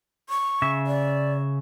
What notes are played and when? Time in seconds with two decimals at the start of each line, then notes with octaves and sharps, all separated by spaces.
0.29 C#6
0.62 C#3 E5
0.87 D5